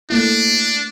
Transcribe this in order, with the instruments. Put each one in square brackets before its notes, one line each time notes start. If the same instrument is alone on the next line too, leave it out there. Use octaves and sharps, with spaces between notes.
[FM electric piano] A3 A#3 E4 [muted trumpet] D4